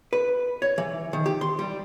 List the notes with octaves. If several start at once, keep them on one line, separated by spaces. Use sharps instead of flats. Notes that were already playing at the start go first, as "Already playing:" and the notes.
B4
C#5
E3
D#3
G4
C6
G3